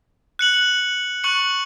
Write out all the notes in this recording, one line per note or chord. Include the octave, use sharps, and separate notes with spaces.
F#6 C#7 F#7
C#6 F#6 C#7 F#7